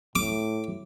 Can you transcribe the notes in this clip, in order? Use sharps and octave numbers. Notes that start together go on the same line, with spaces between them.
A2 D6